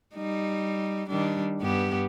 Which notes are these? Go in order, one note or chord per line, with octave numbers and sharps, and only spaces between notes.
G3 D#4
D#3 G3 D4
G2 B3 G4